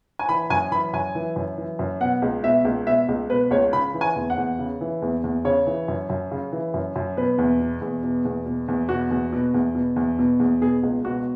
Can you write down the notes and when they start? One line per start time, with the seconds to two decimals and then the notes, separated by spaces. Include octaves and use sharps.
0.19 G#5
0.29 E3 B5
0.50 F#2 G#5
0.71 E3 B5
0.93 F#2 G#5
1.15 E3
1.36 F#2
1.58 E3
1.79 F#2
2.00 B2 F#5
2.22 C#2
2.44 B2 E5
2.65 C#2
2.87 B2 E5
3.09 C#2
3.30 B2 B4
3.51 C#2 C#5
3.73 C#3 B5
3.94 E3
4.01 G#5
4.16 E2
4.30 F#5
4.37 E2
4.59 C#3
4.81 E3
5.02 E2
5.24 E2
5.45 C#3 C#5
5.67 E3
5.88 F#2
6.10 F#2
6.31 C#3
6.52 E3
6.74 F#2
6.96 F#2
7.17 B2 B4
7.38 E2
7.60 B2
7.81 E2
8.03 B2
8.25 E2
8.46 B2
8.68 E2
8.89 B2 F#4
9.11 E2
9.32 B2
9.54 E2
9.75 B2
9.96 E2
10.19 B2
10.40 E2
10.61 B2 G#4
10.83 C#2
11.04 B2 F#4